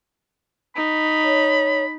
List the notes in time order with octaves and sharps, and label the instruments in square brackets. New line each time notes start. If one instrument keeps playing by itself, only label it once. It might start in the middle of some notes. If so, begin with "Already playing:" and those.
[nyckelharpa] D#4 [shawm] B5
[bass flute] C#5